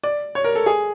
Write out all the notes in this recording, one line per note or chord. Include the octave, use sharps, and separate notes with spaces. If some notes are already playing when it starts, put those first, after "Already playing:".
D5
C#5
A#4
A4
G#4